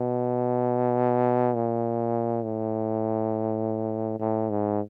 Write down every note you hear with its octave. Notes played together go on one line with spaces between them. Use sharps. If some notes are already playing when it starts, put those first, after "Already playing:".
Already playing: B2
A#2
A2
A2
G#2